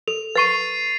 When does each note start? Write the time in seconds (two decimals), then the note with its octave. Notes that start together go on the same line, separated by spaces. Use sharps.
0.08 A4 F7
0.36 B4 C#6 A6 C7 D#7